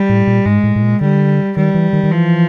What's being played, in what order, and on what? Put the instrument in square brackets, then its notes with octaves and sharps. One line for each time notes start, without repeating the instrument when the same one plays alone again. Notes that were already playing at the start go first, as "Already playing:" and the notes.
Already playing: [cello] G3
[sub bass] A2
A#2
[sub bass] G#2 [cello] G#3
[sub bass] A2
A2
A#2
[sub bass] D3 [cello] G3
[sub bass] D#3 [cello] G3
[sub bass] E3
D#3
D#3
[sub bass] E3 [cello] F3